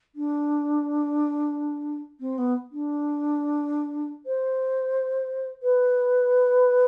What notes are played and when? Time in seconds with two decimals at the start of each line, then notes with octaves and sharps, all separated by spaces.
0.15 D4
2.20 C4
2.38 B3
2.72 D4
4.26 C5
5.62 B4